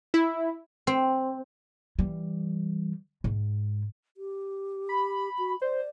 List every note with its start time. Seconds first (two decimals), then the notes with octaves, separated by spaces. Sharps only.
0.14 E4
0.87 C4
1.99 E3 G3
3.24 G#2
4.17 G4
4.89 B5
5.38 F#4
5.62 C5 D5